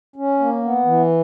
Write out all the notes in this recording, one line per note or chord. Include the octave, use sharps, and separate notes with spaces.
C#4
A#3
B3
E3